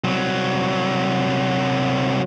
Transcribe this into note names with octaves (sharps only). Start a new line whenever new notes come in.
C2 F#3